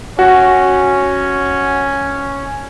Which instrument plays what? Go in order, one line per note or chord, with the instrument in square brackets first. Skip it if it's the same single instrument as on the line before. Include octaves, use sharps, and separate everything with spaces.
[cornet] C#4 [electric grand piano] F#4